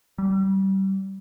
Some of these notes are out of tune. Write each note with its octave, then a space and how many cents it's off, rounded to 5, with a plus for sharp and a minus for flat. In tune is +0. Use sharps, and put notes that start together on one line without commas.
G3 -25